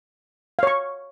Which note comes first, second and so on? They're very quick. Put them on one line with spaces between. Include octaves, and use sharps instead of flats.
F5 C#5 C#6